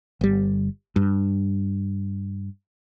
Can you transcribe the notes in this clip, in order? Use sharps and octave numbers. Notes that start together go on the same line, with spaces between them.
G1 G3
G2